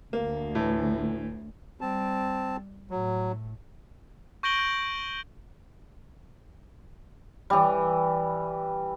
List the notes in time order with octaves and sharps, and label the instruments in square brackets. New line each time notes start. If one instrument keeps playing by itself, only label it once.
[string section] D2 [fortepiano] A#3
[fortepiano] A2 E3
[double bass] G3 [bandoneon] C4 A5
[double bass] A2 [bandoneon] F#3
[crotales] C#6 G6 A#6 D7 F#7 G7
G6
[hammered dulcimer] E3 G3